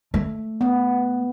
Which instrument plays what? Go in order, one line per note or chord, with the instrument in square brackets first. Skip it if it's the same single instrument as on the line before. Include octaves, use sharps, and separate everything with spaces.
[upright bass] A3
[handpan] B3